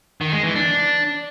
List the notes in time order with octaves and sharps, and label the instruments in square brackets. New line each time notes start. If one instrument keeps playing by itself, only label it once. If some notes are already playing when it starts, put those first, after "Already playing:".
[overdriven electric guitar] D#3
G#3
E3
D4